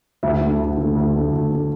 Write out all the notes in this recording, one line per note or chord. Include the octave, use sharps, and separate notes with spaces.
D2 E5
D3 A3
D2
D3 A3
D2
D3 A3
D2
D3 A3